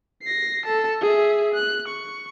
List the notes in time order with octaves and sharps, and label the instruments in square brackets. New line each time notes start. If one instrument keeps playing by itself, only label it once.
[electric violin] A#6 C7
A4 A5
G#4 E5
F#6
C#6